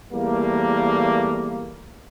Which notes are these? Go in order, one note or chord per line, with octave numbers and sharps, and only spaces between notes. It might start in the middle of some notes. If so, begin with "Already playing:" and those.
E2 G3 A3 A#3